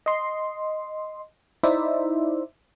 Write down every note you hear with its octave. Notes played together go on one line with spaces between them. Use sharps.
D#5 C6
D#4 E4 C5 D5 E5